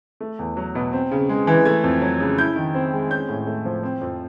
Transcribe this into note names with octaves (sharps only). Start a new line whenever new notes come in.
A3
E2
F#3
B2
C4
C#3
G#3
E3
A3 G#6
F2
F#3
C#3
E4 G6
D#3
C4
G#3
C#4 G6
A2
A3
F3
C4
F2